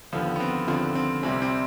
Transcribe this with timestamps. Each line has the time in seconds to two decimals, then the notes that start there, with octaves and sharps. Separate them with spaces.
0.13 D#2 D3 F3 B3
0.36 B3
0.40 C4
0.68 D#2 D3 F3 C4
0.95 C4
1.23 C2 C3 G3 C4
1.42 C4